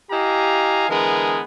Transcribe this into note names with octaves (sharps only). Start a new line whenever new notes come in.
E4 G4 D#5 F5 G#5 A#5
D3 E3 G#3 B3 G#4 A#4